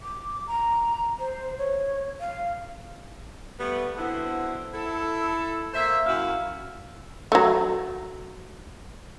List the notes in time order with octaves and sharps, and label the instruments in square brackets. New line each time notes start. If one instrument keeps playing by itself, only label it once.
[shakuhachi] D6
A#5
C5
C#5
F5
[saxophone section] G3 A3 B3
D3 B3 C4 E4 F#4
E4 A4
A#3 C5 E5
F#2 E4 F#4 E5 F5
[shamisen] F#3 A3